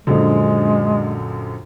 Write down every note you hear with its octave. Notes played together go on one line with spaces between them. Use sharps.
A#1 F#2 D3 G#3